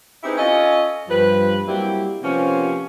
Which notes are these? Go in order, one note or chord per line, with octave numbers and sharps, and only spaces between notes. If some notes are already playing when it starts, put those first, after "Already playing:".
C4 D#4 E4 G4 G#4 B4
C#4 F4 A4 C#5 D#5
G2 F3 B4
F#3 G3 A#3 C4 E4 G4
C3 F3 A#3 B3 C#4